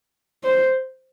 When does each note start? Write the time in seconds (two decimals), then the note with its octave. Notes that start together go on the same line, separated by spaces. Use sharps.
0.44 C5